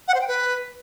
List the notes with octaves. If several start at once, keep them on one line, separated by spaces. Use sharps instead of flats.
F#5
C5
G5
B4